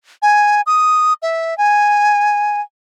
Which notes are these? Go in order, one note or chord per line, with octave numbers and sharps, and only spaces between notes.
G#5
D#6
E5
G#5